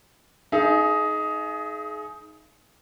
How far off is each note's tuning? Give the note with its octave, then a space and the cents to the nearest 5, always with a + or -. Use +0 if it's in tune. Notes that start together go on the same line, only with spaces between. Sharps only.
D#4 +10 G#4 +30 F5 -45